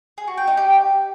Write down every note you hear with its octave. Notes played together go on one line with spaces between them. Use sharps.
G#4
F#4
G5
D#4
G4